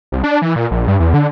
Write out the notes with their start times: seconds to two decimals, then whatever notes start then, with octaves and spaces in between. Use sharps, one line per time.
0.12 C2
0.24 D4
0.42 E3
0.56 A#2
0.71 A#1
0.88 G2
1.00 E2
1.14 D3